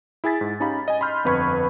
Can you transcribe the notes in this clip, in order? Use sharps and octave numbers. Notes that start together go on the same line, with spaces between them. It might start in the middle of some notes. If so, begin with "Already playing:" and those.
E4 G#4 G#5 A6 B6
G#2
C#4 D#4 G4 F5 B5
D#5 G#5
B5 C6 F6 G6
G1 F2 B4 B5 C#6 G#6